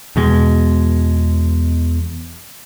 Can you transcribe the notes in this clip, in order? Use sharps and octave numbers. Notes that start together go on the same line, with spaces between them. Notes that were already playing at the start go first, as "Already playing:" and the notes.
E2 B2 G#3